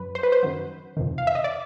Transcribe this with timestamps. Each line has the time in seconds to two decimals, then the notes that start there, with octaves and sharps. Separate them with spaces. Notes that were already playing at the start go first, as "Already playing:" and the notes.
Already playing: F#2 F#3 B4
0.15 C5
0.23 B4
0.32 C5
0.43 F#2 D#3 F#3
0.97 F2 C3 D#3
1.18 F5
1.27 E5
1.35 D#5
1.44 D5